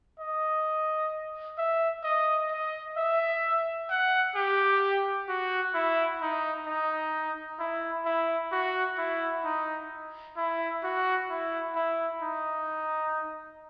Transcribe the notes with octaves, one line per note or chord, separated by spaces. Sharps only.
D#5
E5
D#5
D#5
E5
F#5
G4
F#4
E4
D#4
D#4
E4
E4
F#4
E4
D#4
E4
F#4
E4
E4
D#4